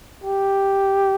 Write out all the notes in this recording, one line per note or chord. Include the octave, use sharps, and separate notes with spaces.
G4